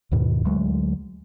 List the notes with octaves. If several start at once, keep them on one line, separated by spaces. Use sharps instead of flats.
D#2 G#2 B2 D#3
D2 F#3 G#3